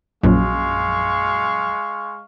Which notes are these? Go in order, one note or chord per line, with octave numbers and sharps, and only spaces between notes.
A#1 F#2 G#3 F5 C#6